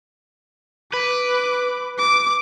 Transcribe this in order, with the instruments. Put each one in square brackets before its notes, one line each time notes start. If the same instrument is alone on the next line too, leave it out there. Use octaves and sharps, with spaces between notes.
[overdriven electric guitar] B4 [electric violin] D6
[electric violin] D6